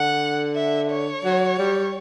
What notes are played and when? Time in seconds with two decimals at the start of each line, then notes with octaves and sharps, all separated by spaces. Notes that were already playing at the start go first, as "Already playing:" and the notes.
Already playing: D3 F#5
0.56 E5
0.90 C#5
1.24 F#3
1.59 G3